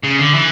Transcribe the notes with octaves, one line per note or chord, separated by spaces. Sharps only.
C#3
D3
E3